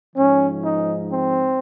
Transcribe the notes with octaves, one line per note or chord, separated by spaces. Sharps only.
G#2 F3 C#4
D#4
C4